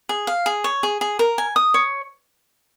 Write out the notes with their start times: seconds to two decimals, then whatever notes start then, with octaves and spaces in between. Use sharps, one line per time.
0.09 G#4
0.27 F5
0.46 G#4
0.64 C#5
0.83 G#4
1.01 G#4
1.19 A#4
1.38 G#5
1.56 D#6
1.74 C#5